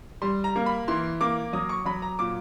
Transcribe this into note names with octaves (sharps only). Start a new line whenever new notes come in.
G3 C6
A#5
A#3
B5
E3 C6
A#3 D6
F#3 D#6
C#6
F#3 B5
A#5
A#2 D6